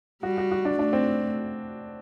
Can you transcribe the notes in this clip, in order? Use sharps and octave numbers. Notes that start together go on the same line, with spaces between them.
G3 F#4
F#4
F#4
D4
A3 D4
C4